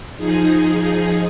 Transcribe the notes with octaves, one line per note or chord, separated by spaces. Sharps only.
F3 D#4 G#4